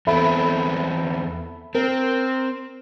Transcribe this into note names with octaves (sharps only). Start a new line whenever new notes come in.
E2 B3 C4 A4 E5 B5
C4 A#4